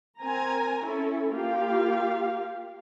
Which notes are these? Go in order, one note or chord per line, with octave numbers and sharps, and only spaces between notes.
C4 A#4 G#5 A#5
C#4 E4 A4
A#3 F4 G4 F5